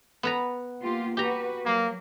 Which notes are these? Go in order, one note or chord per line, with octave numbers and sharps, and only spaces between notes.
B3 B4 A#5
A#3 F4 G4
F#4 G4 B4 A#5
F#3 A#3